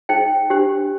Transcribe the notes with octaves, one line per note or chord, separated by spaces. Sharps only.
D#4 G#4 C5 G5
D4 G4 C5